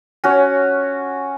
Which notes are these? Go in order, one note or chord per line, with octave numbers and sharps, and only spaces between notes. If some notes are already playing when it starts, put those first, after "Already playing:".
C#4 F#4 C#5